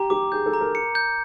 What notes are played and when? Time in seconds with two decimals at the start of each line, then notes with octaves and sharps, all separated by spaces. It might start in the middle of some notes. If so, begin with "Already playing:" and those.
Already playing: G4 A#5
0.10 G4 D6
0.32 G#4 G6
0.46 A4
0.54 A#5
0.61 A#4
0.75 C#7
0.95 G6